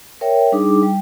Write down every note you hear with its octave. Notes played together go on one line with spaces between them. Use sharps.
A#4 C#5 D5 E5 G5
G3 D4 D#4 G#4 D6
G3 G5